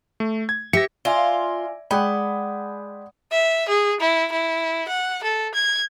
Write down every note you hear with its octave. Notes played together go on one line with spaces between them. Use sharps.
A3
G#6
G4 E5 A#6 C#7
F4 D5 E5 G#5
G#3 D5 F#5 G5 B5 D#6
E5
G#4
E4
E4
F#5
A4
G#6